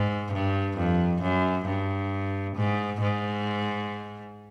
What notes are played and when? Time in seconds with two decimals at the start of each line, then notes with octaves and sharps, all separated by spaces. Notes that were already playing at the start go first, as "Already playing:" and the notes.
Already playing: G#2
0.33 G2
0.77 F2
1.22 F#2
1.66 G2
2.56 G#2
3.01 G#2